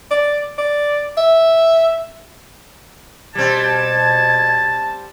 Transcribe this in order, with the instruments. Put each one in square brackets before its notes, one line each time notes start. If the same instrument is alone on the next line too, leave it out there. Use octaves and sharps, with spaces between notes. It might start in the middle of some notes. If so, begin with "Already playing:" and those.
[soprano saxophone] D5
D5
E5
[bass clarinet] B2 [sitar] G3 C4 [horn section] A5 [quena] G#6